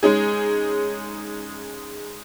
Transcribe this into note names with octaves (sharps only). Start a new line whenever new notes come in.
G#3 C#4 D#4 G#4